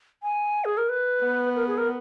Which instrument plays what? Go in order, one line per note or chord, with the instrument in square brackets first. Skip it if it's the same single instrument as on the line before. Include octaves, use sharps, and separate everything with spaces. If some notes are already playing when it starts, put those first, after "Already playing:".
[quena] G#5
G#4
A#4
B4
[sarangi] B3
[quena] A#4
G#4
A#4